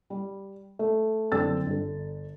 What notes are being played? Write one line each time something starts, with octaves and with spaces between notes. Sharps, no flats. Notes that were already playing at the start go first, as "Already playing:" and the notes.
G3
A3
F#1 D3 C4 D4 E6 A6
G1 D3